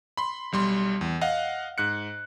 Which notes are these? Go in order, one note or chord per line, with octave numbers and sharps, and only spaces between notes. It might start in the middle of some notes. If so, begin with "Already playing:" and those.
B5 C6
B1 G3 C6
E2
D#5 F5 F#5
G#2 F#6 C#7